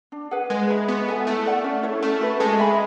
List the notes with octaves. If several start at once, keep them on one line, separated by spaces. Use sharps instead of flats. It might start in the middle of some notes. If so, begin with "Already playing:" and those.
D4
G#4 B4 F#5
G#3 B4
E5 B5
B3 F#4
A4 E5 G#5
A3 E4
A4 D5 F#5
C#4
E4 A4 C#5
A3 C#4
F#4 B4
G#3 A4
E5 G#5 B5